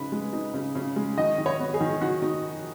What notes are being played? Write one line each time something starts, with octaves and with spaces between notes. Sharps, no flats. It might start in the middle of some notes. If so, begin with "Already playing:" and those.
Already playing: C#3 D#4 B4
G#3
D#4
C#3
C#3
G#3
D#3 D#5
D#3
C#5
B3
G#4
D#3
D#3 F#4
D#4